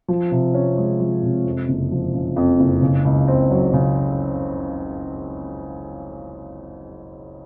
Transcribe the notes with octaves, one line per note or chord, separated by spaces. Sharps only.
F3
C3
C#4
G#3
F3
C3
F2
F#1
F3
C#3
F2
F#1
C#3
C#2
C4
F#3
C#3